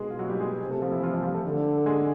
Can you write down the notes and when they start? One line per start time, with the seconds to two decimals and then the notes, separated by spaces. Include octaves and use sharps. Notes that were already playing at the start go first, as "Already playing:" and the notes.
Already playing: B2 G#3 G#4
0.11 F4
0.19 F#3 F#4
0.30 G3 G4
0.40 G#3 G#4
0.61 C3
0.71 A3 A4
0.82 F3 F4
0.92 E3 E4
1.03 F3 F4
1.13 G3 G4
1.23 F3 F4
1.34 A3 A4
1.45 D3
1.77 A4
1.86 G#3 G#4